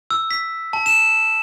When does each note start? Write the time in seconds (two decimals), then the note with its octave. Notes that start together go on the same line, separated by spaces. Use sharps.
0.10 E6
0.31 B6
0.73 A5
0.86 E7